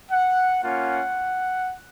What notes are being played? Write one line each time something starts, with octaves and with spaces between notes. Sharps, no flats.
F#5
A#3 C#4 F4 F#5